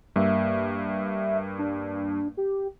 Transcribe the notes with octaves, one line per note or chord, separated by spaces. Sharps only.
G2 A#3 E5
D4
G4